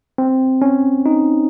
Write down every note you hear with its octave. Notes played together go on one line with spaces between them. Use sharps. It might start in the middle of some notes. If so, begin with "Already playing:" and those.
C4
C#4
D#4